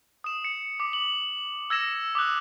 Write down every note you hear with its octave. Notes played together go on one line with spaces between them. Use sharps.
D#6 E7
C#7
D6
F#7
E6 G#6 A#6 E7
D6 D#6 F#6